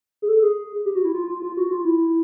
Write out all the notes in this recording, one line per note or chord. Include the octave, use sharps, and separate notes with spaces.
G#4
A4
G#4
G4
F#4
E4
F4
F4
F4
F#4
F4
E4